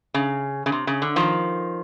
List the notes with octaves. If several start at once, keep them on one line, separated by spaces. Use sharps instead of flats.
C#3
C#3
C3
C#3
D3
D#3 F3